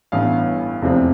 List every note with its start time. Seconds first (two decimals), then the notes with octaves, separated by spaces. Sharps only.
0.12 A1 G2 E3 B3 F5
0.82 F1 E2 C3 F3 C4